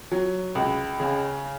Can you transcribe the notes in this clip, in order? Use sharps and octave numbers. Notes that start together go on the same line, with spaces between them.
F#3
C#2
C#3